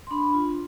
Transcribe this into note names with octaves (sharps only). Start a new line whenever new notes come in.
C6
D4 B5
F4